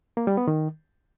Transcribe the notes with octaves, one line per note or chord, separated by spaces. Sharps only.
A#3
G3
B3
D#3